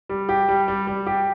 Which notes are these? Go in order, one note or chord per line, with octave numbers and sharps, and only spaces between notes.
G3
G4
G3
G3
G3
G4